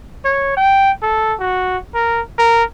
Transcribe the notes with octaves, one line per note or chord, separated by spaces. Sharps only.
C#5
G5
A4
F#4
A#4
A#4